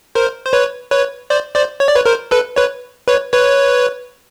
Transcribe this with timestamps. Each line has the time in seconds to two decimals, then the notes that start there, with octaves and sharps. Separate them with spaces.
0.15 A#4 C5
0.46 C5
0.53 B4 C#5
0.91 B4 C#5
1.30 C5 D5
1.55 C5 D5
1.80 C#5
1.88 D5
1.95 B4 C#5
2.06 A#4 C5
2.31 A4 B4
2.56 B4 C#5
3.08 B4 C#5
3.33 B4 C#5